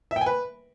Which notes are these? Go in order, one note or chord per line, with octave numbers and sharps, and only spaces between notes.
E5
G5
G#5
B4